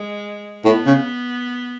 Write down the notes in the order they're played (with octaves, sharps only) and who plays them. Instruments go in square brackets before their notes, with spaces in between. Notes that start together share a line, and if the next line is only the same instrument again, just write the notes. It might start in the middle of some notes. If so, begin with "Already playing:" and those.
Already playing: [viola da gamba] G#3
[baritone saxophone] A2 [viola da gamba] B3
[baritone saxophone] C#3